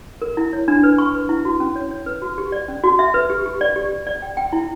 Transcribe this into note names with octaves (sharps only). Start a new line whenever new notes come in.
A#4
E4
C#5
D4
B4
C#6
B4
E4
F#4
C#4
C#5
C#5
B4
F#4
G4
D5
C#4
F#4
E5
B4
G4
G4
D5
G4
D5
D5
G5
G5
E4